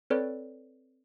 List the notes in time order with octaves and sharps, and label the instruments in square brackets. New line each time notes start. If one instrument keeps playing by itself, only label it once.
[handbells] C4 A4 B4 C#5 D5